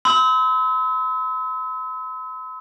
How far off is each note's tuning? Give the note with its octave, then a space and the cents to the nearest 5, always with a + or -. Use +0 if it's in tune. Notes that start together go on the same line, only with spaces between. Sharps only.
C6 -45 E6 -40